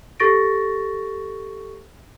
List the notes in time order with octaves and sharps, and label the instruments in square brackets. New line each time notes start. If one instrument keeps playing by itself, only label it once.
[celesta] G4 A4 C#6 A6 A#6 D7